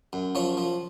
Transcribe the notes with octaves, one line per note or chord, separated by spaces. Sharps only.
F#2
F3 C#5
F3